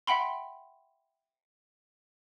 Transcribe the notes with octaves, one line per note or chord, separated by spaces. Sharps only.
E5 F#5 G5 B5 C6